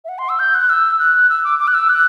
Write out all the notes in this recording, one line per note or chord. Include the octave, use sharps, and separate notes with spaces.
E5
F#5
C6
E6
G6
F#6
E6
F#6
E6
D6
D6
F#6
E6
F#6